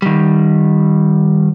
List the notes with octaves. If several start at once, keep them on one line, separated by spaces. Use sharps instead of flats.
D#3 G3